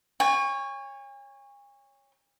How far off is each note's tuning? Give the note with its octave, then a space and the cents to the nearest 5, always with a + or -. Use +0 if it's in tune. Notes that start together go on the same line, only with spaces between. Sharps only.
C#5 +0 G#5 -40